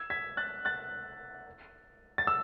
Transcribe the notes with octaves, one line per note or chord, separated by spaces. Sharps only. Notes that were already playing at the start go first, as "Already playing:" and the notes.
Already playing: E6 G#6
G#6 B6
F#6 A6
F#6 A6
A6
E6